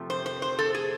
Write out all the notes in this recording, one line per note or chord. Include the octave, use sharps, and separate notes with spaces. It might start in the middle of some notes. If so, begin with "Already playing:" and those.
Already playing: F2 C3 F3 A3
C5
C5
C5
A4
G#4